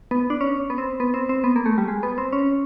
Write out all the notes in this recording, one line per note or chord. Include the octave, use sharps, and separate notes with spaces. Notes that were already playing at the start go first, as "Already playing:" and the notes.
B3
D4
C#4
B3
C4
B3
C4
C4
B3
A#3
A3
G3
G#3
B3
C4
C#4